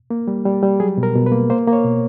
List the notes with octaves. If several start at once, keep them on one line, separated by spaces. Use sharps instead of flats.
A#3
G3
G3
G3
F#3 G#4
B2
A#4
B2
B4
A#3
A#3 C5
A#3
C#5
B2